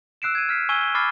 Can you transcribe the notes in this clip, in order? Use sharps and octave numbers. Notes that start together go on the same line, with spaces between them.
E6 F#6 C7 D7 E7
G#6 D#7
F6 B6 C7
G#5 C#6 E6 G#6 D#7 G7
G7
B5 C#6 D6 F6 A6 C7